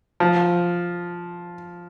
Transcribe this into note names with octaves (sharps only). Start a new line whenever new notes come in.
F3